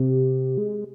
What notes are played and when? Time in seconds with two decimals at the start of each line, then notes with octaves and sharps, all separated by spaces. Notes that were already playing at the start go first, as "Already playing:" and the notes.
Already playing: C3
0.57 G#3